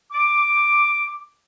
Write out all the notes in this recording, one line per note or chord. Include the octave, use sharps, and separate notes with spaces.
D6